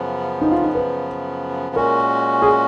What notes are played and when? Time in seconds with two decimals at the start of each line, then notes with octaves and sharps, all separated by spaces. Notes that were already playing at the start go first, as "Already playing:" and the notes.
Already playing: F#2 C#3 F3 B3
0.41 D#4
0.51 F4
0.61 D#4
0.75 B4
1.75 A#2 G#3 C#4 F#4 A#4
2.42 G#4